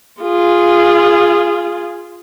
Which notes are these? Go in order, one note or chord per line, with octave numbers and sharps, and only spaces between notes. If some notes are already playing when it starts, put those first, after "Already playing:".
F4 G#4